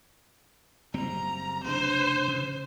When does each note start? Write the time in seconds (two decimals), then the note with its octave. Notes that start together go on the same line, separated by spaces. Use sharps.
0.94 F#1 G3 C4 A#5
1.64 F1 C#3 D4 C5
2.28 C#3